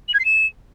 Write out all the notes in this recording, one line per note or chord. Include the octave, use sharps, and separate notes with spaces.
F#7
G#6
C7
E7